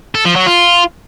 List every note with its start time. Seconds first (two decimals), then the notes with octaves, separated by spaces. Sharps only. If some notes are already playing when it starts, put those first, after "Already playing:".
0.15 A4
0.25 F3
0.36 F#3
0.46 F4